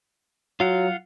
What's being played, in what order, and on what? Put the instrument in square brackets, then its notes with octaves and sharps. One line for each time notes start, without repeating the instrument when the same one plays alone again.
[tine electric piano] F#3 [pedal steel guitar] F4 F5 F#5